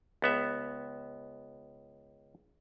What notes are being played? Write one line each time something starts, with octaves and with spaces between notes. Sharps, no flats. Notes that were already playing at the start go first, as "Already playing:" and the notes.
C#2 B3 E5